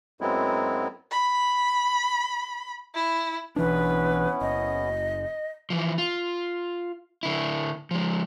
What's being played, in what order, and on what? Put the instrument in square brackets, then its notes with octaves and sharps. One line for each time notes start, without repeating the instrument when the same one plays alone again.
[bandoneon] F#2 F#3 G#3 B3 C4 E4
[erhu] B5
E4
[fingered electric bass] B1 E3 D4 [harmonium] B3 C#4 E4 [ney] B4
[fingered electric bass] F#1 [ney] D#5
[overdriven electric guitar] E3 F3
F4
D3 E4
F3 G#3